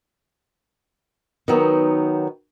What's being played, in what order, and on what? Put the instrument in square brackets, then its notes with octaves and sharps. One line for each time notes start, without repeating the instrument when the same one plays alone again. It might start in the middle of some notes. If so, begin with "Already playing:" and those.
[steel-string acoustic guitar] D#3 F#3 B3 D#4